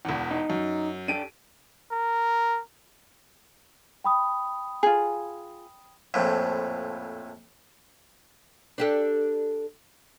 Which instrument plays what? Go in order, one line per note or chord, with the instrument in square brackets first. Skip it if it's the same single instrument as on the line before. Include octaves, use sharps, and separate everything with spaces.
[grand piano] E1 E2
[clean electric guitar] D#4
[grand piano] F#2
[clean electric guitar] D4 G4 A4 [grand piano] D7 D#7
[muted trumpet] A#4
[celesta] G5 B5 D#6
[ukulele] F4 G#4
[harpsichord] A#1 F2 A2
[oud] D4 G4 A4